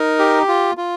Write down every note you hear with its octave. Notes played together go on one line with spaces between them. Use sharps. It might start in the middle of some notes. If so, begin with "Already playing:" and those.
Already playing: D#4 A#4
G4
F4
F4